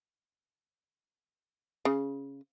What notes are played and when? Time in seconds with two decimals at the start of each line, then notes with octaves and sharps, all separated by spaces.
1.85 C#3